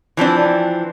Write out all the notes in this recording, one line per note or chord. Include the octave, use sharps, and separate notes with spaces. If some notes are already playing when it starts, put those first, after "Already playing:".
E3 F3 C4 D4